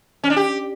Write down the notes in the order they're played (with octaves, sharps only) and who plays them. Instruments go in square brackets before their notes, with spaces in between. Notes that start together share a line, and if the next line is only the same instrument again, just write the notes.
[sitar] C#4
D4
G4